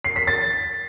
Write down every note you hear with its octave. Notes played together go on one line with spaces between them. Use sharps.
C7
B6
A6